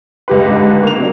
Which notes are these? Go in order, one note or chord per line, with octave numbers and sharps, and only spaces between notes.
C#2 G4 B4
G#2 D3
A#3 F7
C3 F#3 D4